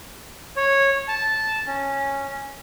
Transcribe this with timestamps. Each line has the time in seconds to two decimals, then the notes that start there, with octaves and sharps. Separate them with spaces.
0.56 C#5
1.08 A5
1.67 C#4